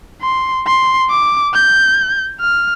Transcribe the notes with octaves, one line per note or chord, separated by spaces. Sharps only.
C6
C6
D6
G6
F6